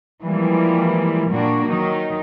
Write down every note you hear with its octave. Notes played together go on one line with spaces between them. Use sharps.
E3 F3 G3 G#3 A#3
A#2 G3 A#3 D4 F#4
D#3 F#3 D#4